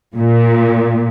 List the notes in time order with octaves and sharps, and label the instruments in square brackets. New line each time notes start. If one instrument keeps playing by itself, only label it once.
[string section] A#2